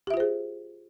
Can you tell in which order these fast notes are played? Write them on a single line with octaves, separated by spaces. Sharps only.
G4 E5 F4 C5 G#4